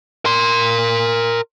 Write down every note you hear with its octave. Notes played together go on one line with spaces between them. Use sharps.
A#4 C6